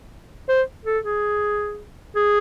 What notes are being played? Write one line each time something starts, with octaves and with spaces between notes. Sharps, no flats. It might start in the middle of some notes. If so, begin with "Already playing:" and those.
C5
A4
G#4
G#4